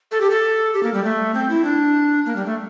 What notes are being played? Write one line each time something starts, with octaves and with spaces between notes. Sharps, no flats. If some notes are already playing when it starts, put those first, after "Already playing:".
A4
G4
A4
G4
A#3
G3
A3
C4
E4
D4
A#3
G3
A3